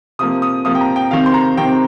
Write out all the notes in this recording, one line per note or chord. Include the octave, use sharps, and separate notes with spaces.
C3 F3 A#3 D#6
D#6
C3 F3 A#3 D#6
G5
A#5
G5
C3 D#3 C4 F5
C6
A#5
C3 D#3 C4 G5